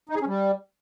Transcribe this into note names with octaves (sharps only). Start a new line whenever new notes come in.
D#4
G#4
C#4
G3